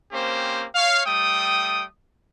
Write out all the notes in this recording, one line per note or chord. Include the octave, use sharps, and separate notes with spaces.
A#3 C4 C#4 G4 C5
C#5 F5
G3 A3 G5 D#6